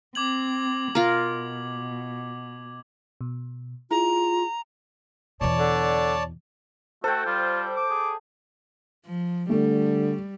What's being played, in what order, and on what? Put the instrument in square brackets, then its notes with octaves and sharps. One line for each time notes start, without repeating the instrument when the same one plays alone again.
[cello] C4 [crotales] D6 G#6 F#7
[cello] B2 [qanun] F4 A#4
[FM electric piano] B2
[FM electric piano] E4 G#4 [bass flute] F4 [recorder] A#5
[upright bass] E2 B2 [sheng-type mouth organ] C#5 D5 A5
[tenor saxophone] D3
[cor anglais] A3 [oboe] F#4 [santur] A4 G5 [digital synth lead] C5
[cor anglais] G3 [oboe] F4
[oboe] D6
[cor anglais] G#4
[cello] F3
[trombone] D3 [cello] G3 [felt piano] A3